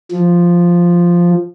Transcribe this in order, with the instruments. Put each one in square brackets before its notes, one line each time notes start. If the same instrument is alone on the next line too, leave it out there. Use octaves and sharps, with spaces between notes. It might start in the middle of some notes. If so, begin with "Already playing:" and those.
[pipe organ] F3